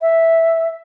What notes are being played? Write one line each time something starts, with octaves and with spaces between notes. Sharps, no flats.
E5